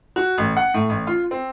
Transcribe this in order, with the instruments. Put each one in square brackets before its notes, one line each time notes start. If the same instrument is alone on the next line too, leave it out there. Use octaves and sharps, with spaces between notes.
[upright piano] F#4
A1
F#5
A2
A1
F4
C4